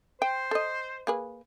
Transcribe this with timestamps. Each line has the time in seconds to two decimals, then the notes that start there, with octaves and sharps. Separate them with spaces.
0.22 C5 G5
0.51 A4 D#5
1.07 A#3 G#4 B4